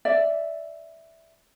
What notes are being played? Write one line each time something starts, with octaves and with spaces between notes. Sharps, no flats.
D5 E5